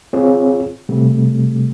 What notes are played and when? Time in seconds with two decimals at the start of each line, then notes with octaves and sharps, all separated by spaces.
0.13 C4 F4 G#4 C#5
0.89 C3 G3 A3